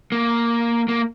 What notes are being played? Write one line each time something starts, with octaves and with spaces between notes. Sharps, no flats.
A#3
A#3